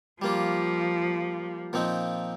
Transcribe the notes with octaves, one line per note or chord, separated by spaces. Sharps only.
F3 G3 A#3 F4
A#2 F3 C4 D#4